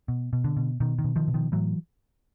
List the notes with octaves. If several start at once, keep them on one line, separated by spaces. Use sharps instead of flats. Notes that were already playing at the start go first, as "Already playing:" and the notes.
B2
B2
D3
B2
B2 D#3
D#3
B2
D#3 F3
B2
D#3 F3
A2 E3 F#3